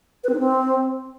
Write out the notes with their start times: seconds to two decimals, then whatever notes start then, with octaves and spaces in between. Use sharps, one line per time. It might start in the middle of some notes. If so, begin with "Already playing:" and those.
0.24 B4
0.29 C4
0.34 D#4
0.39 C4